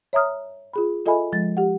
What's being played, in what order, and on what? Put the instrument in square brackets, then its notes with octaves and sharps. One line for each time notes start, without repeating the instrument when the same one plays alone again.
[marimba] C#5 E5 A#5 D#6 F6
F4 G#4 B5
F4 A4 D#5 E5 G#5 B5
F3 G#3 A6
G4 F#5